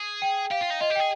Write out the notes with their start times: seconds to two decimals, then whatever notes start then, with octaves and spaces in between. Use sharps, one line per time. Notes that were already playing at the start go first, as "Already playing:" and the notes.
Already playing: G#4
0.22 G5
0.51 G4 F5
0.61 F4
0.70 D#4
0.81 F4 D#5
0.90 G4
0.95 G#4 G5